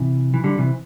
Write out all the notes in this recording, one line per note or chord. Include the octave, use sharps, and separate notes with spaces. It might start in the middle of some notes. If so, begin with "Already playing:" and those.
Already playing: C3 E3
E3
D3 G3
C3 E3